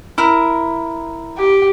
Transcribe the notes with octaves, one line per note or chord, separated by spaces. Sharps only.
E4 A#4
G4